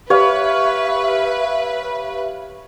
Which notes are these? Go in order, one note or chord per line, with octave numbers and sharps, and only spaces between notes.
G4 B4 C#5 E5 F5